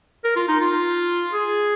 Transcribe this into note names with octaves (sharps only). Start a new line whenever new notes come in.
A#4
F4
D#4
F4
G#4